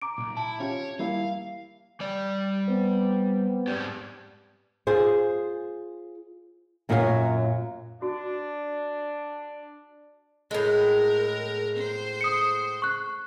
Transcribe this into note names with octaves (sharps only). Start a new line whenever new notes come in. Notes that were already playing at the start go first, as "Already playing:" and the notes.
A#5 D6 D7
B1 A#2
E4 A5
C#4 F4 G4 C#5
G3 A#3 E4 F5
G3 D5
B3 C4
G#2 G4 D5
F4 G#4 C5
F#2 A#2 F#3 F#4 C#5 F5
D4 F#4
A2 G#3 A#4
C5
D#6 C#7
C#6 F#6